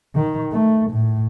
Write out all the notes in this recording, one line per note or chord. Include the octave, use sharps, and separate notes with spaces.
D#3
A3
A2